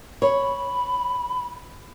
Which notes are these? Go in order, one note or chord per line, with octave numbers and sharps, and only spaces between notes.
C#5 B5